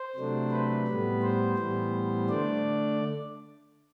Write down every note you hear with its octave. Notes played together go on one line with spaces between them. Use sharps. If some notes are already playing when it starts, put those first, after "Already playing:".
Already playing: C5
C3 F#3 A3 D4
B4
A2 G3 B3
C5
A2 E3 G3 B3
D3 A3 D4 D5